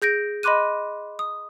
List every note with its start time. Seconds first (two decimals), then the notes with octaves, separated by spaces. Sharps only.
0.02 G#4 G6 A#6 D7
0.43 D#5 B5 C6 D6 F#6 D#7
1.19 D#6